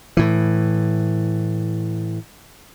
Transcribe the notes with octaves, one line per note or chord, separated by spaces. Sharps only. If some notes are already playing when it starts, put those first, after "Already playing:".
A2 E3